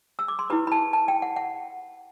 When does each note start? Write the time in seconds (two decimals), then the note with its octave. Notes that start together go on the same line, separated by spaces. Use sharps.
0.19 E6
0.28 D6
0.39 C6
0.50 E4 G4 B4 B5
0.67 B5
0.72 A5
0.93 A5
1.08 G5
1.22 F#5
1.36 F#5